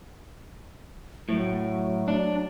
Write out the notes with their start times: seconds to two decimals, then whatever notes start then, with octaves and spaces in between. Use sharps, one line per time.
1.29 A2 F#3
2.08 D4